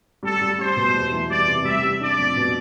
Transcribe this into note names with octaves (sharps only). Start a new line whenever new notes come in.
G3 A4
G3
G3 C5
B2
E2
E3
G3 D5
C3
G3 E5
G3
D4 D5
F2
B2